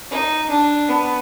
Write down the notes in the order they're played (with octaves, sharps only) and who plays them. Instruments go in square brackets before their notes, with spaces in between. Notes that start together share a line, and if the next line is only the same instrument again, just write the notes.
[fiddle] D#4
D4
B3